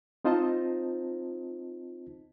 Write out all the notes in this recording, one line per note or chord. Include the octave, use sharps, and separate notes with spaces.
C4 D#4 F4 C5 D#5 A5